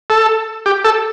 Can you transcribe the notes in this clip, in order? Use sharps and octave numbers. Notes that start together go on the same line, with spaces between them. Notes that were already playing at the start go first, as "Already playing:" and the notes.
A4
G4
A4